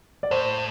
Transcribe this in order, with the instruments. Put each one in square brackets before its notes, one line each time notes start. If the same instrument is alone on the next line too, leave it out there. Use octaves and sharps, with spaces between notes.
[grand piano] D5
[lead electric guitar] A2 [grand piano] C5